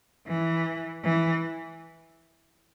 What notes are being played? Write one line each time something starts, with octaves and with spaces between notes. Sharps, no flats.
E3
E3